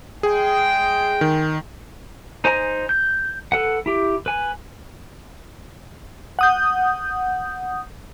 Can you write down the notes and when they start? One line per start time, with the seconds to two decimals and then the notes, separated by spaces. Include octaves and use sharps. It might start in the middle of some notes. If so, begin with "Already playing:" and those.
0.23 G#3 G#4 G5
1.21 D#3
2.44 D#4 C5 G#5 A#5
2.89 G6
3.52 A4 B4 F#5
3.86 E4 G4
4.26 B4 G#5
6.39 F#5 D#6 G6